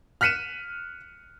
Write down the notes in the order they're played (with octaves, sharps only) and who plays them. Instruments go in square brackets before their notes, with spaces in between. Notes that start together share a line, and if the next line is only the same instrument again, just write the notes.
[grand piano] F6 F#6 B6 C#7 D#7 E7